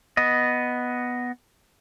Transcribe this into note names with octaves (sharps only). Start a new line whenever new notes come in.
B3 D#5